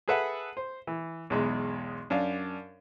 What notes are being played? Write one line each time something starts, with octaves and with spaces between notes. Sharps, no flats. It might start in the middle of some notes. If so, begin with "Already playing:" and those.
G#4 A4 B4 E5 F#5
C5
E3
B1 E2 G#3
F#2 D4 F5